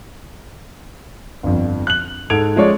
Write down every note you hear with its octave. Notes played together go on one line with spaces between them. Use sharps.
G1 F2
F#6 F#7
G#2 A4 G#6 D7 F7
F3 G#3 C#4 C#5 D5